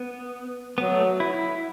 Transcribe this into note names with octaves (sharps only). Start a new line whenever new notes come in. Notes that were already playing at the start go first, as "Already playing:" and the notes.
Already playing: B3
F#3 B3
A3
E4
E4